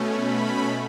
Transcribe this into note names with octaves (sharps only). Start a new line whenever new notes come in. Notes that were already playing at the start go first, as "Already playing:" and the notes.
Already playing: B2 A3 C#4
B5